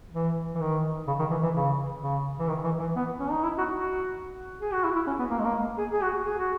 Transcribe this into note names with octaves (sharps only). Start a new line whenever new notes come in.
E3
E3
D#3
C#3
D#3
E3
E3
C#3
C#3
E3
D#3
E3
E3
B3
C#4
D#4
E4
F#4
F#4
G#4
F#4
E4
E4
C#4
B3
A#3
G#3
A#3
G#4
G#4
F#4
G#4
F#4